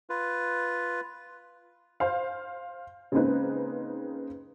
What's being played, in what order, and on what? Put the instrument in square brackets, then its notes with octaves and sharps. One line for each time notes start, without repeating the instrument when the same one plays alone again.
[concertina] F4 B4
[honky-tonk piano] C5 F5
C#3 G#3 A#3 C4 D#4 B4